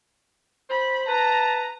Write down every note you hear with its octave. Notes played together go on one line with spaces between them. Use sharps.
C5 B5
B4 A5 A#5